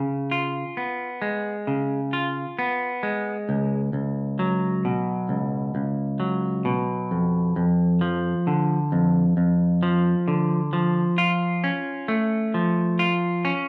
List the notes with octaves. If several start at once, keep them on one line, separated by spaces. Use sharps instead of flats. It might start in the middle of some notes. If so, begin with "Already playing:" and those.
Already playing: C#3
F4
B3
G#3
C#3
F4
B3
G#3
C#2
C#2
F#3
B2
C#2
C#2
F#3
B2
F2
F2
F3
D3
F2
F2
F3
D3
F3
F4
C#4
A3
F3
F4
C#4